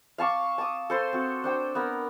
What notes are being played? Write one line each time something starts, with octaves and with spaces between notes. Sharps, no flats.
F5 A5 C#6 D6
A5 D6 D#6
A4 C5 C6
C4 F#4
D4 C5 G5
B3 A#4